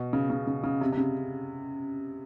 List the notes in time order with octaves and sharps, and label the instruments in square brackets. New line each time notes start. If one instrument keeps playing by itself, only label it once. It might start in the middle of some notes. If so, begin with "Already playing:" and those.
Already playing: [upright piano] B2
C#3
C#3
C#3
C#3
C3
C3
C#3